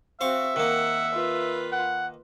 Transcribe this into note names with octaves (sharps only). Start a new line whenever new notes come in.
C4 F#4 C5 E5 F5 C#6
D#3 A#3 F#5
F4 B4
F#5